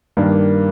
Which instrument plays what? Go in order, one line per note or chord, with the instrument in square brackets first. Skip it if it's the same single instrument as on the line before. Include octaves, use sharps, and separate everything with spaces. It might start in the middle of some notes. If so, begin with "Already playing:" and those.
[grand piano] G2 D#3 A#3 D4